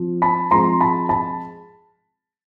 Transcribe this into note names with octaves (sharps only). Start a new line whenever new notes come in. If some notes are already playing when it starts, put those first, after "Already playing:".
Already playing: F3 C4
A5 B5
F3 G#3 C4 A#5 C6
A5 B5
A5 B5